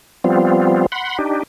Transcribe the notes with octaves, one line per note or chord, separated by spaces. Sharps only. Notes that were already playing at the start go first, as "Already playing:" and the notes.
F3 G3 B3 C4 F4
F#5 B5 C6
D4 D#4 G4